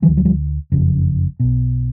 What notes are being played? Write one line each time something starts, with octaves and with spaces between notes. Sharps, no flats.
D2 D3 E3 F#3
F#3
F3 G3
F#1 F2 C#3
B1 B2